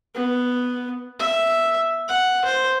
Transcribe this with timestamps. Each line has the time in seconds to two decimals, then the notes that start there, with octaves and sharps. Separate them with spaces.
0.15 B3
1.19 E5
2.09 F#5
2.45 C5